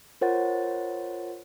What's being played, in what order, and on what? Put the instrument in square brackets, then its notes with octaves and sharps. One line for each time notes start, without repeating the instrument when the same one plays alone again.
[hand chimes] F4 A#4 C5 C#5 F#5 A6